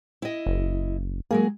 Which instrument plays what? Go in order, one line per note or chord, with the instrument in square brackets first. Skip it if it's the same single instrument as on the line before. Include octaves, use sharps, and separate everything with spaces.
[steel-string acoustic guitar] E4 D#5
[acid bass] F#1
[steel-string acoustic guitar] F#3 G#3 G#4 [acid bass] A#3